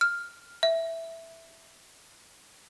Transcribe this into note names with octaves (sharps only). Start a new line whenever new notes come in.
F6
E5